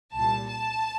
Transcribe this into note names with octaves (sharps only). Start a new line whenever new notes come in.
C2 A#2 G3 A5
A5